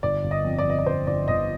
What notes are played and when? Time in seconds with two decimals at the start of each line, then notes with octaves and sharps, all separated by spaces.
0.03 G1 D5
0.24 G1
0.31 D#5
0.45 F2
0.58 D5
0.65 G1
0.70 D#5
0.79 D5
0.86 G1 C5
1.07 G1 D5
1.28 G1 D#5